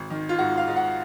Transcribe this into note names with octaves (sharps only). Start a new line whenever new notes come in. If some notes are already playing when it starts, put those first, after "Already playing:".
Already playing: G#1
D#3
F4
G#2 F#4
F5
G#2
F#5